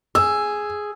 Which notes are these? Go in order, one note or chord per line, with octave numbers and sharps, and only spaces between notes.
G#4 E6